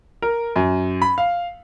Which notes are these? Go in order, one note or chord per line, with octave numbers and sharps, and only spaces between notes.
A#4
F#2
B5
F5